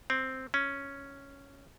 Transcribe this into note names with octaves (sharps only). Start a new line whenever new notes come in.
C4
C#4